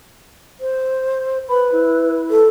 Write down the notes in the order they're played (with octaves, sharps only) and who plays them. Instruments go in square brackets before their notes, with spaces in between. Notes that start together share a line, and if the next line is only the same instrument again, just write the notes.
[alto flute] C5
[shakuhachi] B4 [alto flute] B5
[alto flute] E4
[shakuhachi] A4